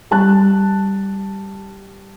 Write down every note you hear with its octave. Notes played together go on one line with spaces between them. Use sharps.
G3 A5 F#6